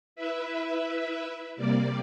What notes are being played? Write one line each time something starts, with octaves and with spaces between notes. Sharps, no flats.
E4 B4 E5
C3 G3 A#3 D5